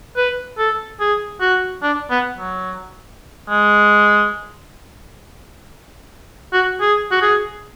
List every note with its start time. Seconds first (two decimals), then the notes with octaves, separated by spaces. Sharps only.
0.17 B4
0.58 A4
1.00 G#4
1.41 F#4
1.83 D4
2.11 B3
2.39 F#3
3.49 G#3
6.53 F#4
6.81 G#4
7.11 F#4
7.22 G#4